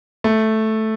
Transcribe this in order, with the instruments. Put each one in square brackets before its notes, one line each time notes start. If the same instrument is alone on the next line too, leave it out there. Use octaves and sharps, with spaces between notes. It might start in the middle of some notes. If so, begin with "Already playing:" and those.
[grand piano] A3